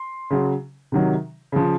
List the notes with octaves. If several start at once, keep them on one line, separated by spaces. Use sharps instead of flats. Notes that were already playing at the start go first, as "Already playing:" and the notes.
Already playing: C6
C#3 F#3
C3 D#3 F#3
C#3 F3